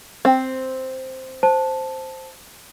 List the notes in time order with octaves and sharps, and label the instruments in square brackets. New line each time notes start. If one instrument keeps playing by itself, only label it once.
[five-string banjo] C4
[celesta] C5 A5